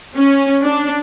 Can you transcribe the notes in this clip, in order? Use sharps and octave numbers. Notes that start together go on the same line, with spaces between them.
C#4
D4